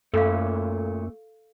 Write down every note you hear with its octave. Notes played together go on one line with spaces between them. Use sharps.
F#2 A#2 A3 A4 F5